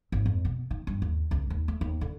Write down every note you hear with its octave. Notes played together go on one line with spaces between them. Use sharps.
G#1
F2
B2
D#3
G2
D#2
C#2
D#2
A3
D#2
D3